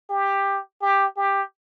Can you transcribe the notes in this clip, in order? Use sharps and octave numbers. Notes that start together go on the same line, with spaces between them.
G4
G4
G4